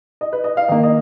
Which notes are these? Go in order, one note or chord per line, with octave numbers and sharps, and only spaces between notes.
D#5
B4
D#5
F5
D#3 A#3 D#5
D#5